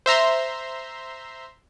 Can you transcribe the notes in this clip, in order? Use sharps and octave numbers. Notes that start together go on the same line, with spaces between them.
C5 E5 A#5 C6